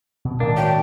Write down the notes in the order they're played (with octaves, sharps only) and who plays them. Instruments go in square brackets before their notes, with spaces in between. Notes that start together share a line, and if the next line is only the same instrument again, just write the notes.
[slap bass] B2
[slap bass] A2 D#3 G#3 [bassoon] A#3 [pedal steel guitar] D4
[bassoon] F#3 [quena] G5